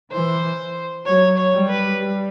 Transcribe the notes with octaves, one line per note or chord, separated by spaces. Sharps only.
E3 C5
F#3 C#5
C#5
G3
B4
G3